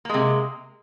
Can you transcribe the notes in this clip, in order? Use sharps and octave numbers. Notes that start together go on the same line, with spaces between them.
C3 G#3 A#3